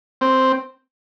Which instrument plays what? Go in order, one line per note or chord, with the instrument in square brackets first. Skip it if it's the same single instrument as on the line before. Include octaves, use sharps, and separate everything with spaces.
[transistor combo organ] C4